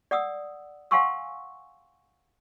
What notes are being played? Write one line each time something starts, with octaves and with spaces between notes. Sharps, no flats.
D5 F#5 D#6 E6
F5 F#5 G#5 C6 C#6 E6